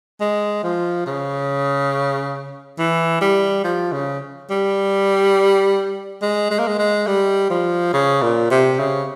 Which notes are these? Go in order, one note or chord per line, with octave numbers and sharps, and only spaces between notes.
G#3
F3
C#3
E3
G3
F3
C#3
G3
G#3
G#3
A#3
G#3
G#3
G3
F3
C#3
A#2
C3
C#3